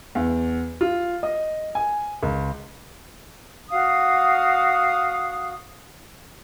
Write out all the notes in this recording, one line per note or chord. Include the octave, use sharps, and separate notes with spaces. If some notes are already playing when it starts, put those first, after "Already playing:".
E2
F4
D#5
G#5
C#2
F#4 F5 D#6